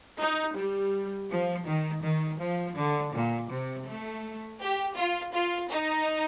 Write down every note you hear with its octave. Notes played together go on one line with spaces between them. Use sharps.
D#4
G3
F3
D#3
D#3
F3
D3
A#2
C3
A3
G4
F4
F4
D#4